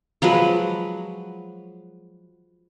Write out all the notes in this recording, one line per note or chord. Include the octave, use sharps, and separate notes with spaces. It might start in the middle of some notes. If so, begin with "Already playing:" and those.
F3 F#3 G#3 B4